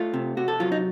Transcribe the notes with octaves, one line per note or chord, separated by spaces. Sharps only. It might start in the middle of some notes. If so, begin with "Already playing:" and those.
Already playing: A3 F4
C3
C3 F#4
A4
F#3 F4
D#4